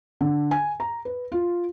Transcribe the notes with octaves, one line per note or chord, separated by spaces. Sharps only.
D3
G#5
A#5
B4
F4